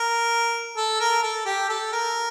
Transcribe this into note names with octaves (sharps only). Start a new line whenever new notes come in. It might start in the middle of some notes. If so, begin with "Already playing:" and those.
Already playing: A#4
A4
A#4
A4
G4
A4
A#4